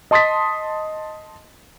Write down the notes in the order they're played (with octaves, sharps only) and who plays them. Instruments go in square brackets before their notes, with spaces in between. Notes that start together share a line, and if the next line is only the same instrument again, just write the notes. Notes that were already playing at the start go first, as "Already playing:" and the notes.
[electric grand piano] D#5 A5 C6 D#6 A6 B6